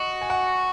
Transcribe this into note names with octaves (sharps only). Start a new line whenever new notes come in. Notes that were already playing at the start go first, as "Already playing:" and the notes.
Already playing: F#4 D#5
G#5
F#5